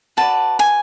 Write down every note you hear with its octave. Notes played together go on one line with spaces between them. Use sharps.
F#4 B4 D5 A5
G#5